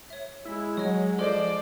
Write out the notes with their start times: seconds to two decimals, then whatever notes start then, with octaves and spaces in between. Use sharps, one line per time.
0.10 C#5 E5
0.45 G#3 E4
0.77 F#3 C#5 D#5
1.19 F3 A4 C5 D5 D#5